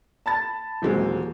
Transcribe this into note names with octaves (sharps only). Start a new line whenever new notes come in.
A5 B5 A6
D#1 E3 F#3 G#3 C4